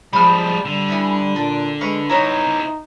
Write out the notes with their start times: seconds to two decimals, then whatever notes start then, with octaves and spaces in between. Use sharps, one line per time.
0.13 F3 G3 G#3 B5 F6
0.65 D3 G3
0.88 B3 E4 G#5
1.36 A#2 D4
1.81 G#3 B4 F5 C#6
2.09 B3 D#4 E4 C5 C#5 A#5